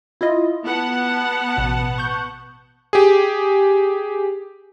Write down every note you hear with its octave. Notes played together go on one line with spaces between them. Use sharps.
E4 F4 D#5
B3 F#5 A5
A1 B2
C#6 G6
G4 G#4